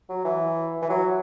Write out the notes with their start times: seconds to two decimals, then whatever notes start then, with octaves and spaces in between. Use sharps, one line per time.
0.09 F#3
0.25 E3
0.82 E3
0.89 F#3